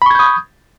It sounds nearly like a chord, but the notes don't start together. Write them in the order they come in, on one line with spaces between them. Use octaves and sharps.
B5 C#6 G#6 G6 D#6